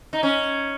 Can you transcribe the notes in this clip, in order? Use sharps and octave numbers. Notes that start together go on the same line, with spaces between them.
D#4
C#4